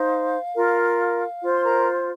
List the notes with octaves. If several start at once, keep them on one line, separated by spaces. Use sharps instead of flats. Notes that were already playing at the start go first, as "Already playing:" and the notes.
Already playing: D#4 C5 F5
F4 A#4
F4 C5
C6
A#4 A#5